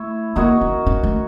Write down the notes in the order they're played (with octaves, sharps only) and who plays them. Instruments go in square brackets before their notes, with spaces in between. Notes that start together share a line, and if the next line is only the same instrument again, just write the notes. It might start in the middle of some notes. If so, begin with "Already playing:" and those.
Already playing: [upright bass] A3 [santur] E4 C#5 E5
[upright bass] A#3 [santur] D#4 F#4 A#4 C#5
[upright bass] C#4
C#4
A3